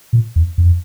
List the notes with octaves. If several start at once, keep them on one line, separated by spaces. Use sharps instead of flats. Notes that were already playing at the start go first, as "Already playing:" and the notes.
A#2
E2
F2